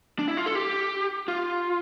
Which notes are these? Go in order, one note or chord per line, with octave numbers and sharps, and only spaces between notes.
D4
E4
F4
A4
G4
F4